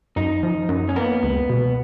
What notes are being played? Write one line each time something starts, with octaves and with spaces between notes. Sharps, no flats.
F#2 D#4
F3
F#2
C#4
A#3 B3
C#2
B2